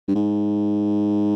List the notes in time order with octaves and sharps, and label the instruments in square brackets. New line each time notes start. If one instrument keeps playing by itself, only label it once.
[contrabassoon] G2
G#2